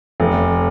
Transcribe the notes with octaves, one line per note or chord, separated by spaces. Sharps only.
F1